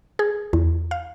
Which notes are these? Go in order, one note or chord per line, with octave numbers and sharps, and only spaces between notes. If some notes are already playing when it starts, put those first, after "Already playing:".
G#4
E2
F5